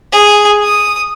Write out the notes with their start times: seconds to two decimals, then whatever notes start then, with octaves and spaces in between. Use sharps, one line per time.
0.12 G#4
0.64 D#6